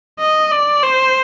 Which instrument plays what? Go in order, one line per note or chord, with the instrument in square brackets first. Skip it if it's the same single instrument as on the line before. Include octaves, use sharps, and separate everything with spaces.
[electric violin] D#5
D5
C5